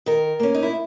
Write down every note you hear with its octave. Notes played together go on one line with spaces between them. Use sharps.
D#3 A#4
A#3 C#4
D#4
E4